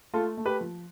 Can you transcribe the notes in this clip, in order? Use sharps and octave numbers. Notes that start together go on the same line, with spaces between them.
A3 F4 A4
A3
G4 B4
F3